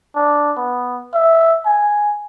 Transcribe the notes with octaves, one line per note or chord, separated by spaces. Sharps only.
D4
B3
E5
G#5